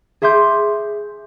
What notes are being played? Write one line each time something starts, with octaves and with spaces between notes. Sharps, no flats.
G#4 E5 C6 D6 G6